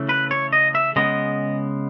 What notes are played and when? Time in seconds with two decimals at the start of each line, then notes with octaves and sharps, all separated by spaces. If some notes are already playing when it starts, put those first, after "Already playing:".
Already playing: C#3 E3 A3
0.09 B4
0.31 C#5
0.53 D#5
0.75 E5
0.96 C#3 G#3 B3 D#5